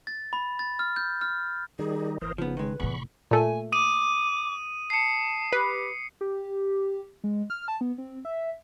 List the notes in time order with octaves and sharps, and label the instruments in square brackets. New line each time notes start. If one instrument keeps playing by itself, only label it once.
[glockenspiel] A6
B5
A6
F6
G6
F6
[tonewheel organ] D#3 G3 D#4 [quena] G#4
[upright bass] G1 [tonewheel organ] E3 A#4 C5 [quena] D#6
[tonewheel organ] C#3 [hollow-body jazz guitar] F3 B3 [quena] D#4
[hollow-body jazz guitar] D#3 G#3 [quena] B4
[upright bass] F1 A2 [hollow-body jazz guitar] E2 [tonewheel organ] B5 C#6
[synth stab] A#2 A3 [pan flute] G#5
[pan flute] D6 [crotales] D#6 D#7
[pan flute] A5 [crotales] C7 C#7
[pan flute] G4 [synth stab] B4
[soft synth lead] G4
G#3
F6
A5
B3
C4
E5